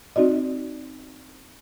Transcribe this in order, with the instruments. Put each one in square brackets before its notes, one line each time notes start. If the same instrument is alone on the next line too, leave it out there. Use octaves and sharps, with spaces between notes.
[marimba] C4 D#4 F#4 D5 D#5